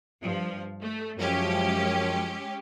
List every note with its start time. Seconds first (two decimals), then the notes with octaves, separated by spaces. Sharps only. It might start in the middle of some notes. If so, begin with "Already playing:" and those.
0.22 G2 F3
0.81 A3
1.18 F#2 F3 G#3 C#4 G4